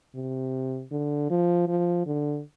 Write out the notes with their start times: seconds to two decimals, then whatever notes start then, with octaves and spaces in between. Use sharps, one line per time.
0.15 C3
0.91 D3
1.30 F3
1.68 F3
2.06 D3